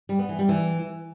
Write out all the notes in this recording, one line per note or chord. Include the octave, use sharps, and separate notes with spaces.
G3
B3
E3
G3
E3